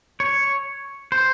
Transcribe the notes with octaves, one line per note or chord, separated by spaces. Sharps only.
C#5
C5